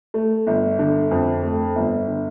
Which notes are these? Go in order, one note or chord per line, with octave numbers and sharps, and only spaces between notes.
A3
G1
D3
F2
A3
G1
D3